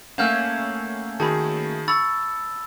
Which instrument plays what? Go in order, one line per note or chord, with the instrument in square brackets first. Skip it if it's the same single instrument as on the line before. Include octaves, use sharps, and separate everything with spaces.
[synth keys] A3 A#3 C#4 [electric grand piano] F5 F#5 [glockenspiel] F6 G6 E7
[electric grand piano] D#3 F#4 G#4 [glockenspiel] A5 B5
[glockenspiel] B5 E6 A6 [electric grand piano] C#6